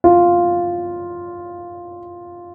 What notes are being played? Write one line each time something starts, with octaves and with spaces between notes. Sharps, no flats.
F4